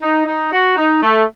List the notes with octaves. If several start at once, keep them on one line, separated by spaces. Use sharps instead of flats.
D#4
D#4
F#4
D#4
A3